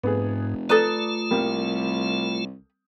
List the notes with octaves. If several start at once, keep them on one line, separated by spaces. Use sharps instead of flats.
F1 G#2 B3 G#4
A3 F4 A4 B4 D5 A#5 D#6
C2 G3 A#3 C4